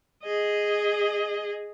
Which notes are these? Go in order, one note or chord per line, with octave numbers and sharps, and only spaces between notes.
G#4 D#5